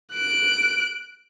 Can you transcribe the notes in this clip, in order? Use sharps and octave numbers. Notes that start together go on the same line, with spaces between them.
F#6 D7